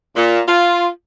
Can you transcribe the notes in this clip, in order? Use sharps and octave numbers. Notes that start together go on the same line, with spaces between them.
A#2
F4